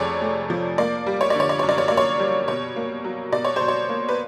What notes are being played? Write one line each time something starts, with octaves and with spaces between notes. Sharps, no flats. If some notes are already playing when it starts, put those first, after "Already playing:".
Already playing: F2 C3 A3 G#4 C#5 D5
A3
F3
A#3 D5
G3
C#5
D3 D5
C#5
D5
F#2 C#5
D5
C#5
A#3 D5
C#5
G3
B2 C#5
A#3
F#3
B2 D5
C#5
B2 C5
C#5
A#3
B4